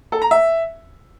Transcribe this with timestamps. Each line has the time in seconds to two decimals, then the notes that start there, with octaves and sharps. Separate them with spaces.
0.12 A4
0.22 A#5
0.31 E5